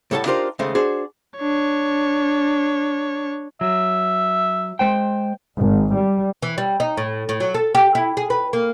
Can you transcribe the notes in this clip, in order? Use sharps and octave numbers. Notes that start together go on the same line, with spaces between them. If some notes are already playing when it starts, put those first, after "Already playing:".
A2 G3 A4 C#5 F#5 A5
D4 D#4 F4 G4 A#4 C5
D#2 C#3 G#3 A3 C5
D4 F#4 G#4 C5
D4 C#5
F#3 E5
G#3 C5 G5
G#1
G3
E3
G3
D#4
A2
A2
F#3
A4
G4
E4
G#4
B4
A#3